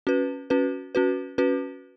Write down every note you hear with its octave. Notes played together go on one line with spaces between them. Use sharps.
C#4 F#4 B4
C#4 F#4 B4
C#4 F#4 B4
C#4 F#4 B4